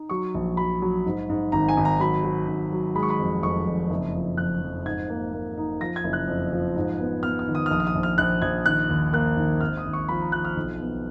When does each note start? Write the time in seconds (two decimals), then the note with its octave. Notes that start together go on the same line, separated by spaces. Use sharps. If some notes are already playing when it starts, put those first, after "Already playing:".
Already playing: D#4
0.10 F#3 C#6
0.34 A#1
0.57 F#3 B5
0.82 F#3
1.06 G#2
1.29 G#2
1.52 G#1 A#5
1.69 G#5
1.77 G#1
1.85 A#5
2.00 F#3 B5
2.24 F#3
2.48 G#1
2.72 F#3
2.95 G#3 B5
3.03 C#6
3.10 B5
3.19 F2
3.42 F1 C#6
3.66 F2
3.90 F#1
4.14 F3
4.37 F2 F#6
4.61 F2
4.85 G#2 G#6
5.10 A#3
5.33 A#3
5.58 D#4
5.81 F3 A#6
5.96 G#6
6.04 F#1
6.13 F#6
6.28 F2
6.53 F3
6.76 G#2
6.99 B3
7.23 B3 F6
7.39 F6
7.48 D#3
7.55 D#6
7.66 F6
7.70 A#1 D#6
7.80 F6
7.87 D#6
7.95 A#1
8.03 F6
8.18 A#1 F#6
8.42 A#1 G#6
8.65 D#3 F#6
8.89 D#2
9.13 A#3 F#6
9.37 D#2
9.61 G#1 F6
9.77 D#6
9.85 G#1
9.93 C#6
10.09 F3 B5
10.21 A#5
10.32 F3 F#6
10.45 F6
10.56 B1
10.81 B3